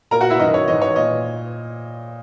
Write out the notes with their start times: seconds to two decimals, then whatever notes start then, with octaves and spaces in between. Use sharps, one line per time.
0.11 A#2 A#4 A#5
0.21 F#4 F#5
0.30 E4 E5
0.39 F#2 D#3 D#5
0.54 C#5
0.68 G#2 E3 D#5
0.82 C#5
0.96 A#2 D#5